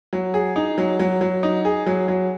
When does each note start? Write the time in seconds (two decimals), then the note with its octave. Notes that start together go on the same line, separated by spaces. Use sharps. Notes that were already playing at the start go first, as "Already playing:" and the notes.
0.13 F#3
0.34 G#4
0.56 D#4
0.78 F#3
0.99 F#3
1.21 F#3
1.43 D#4
1.65 G#4
1.86 F#3
2.08 F#3